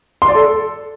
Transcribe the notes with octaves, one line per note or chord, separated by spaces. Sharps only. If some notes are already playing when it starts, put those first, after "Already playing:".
C6
D5
A4